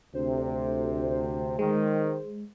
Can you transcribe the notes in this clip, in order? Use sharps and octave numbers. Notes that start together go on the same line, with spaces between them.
D2 C3 C5
D#3 G#3